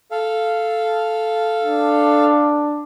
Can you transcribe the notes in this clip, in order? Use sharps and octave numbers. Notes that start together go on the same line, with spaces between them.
A4 F5
D4